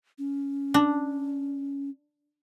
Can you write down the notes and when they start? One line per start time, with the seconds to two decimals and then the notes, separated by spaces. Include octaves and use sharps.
0.18 C#4
0.74 D4